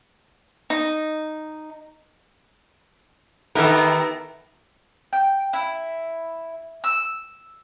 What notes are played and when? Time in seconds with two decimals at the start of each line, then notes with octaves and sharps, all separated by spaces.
0.70 D#4
3.55 D#3 B3 E4 G4 A4 A#4
5.13 G5
5.53 E4
6.84 E6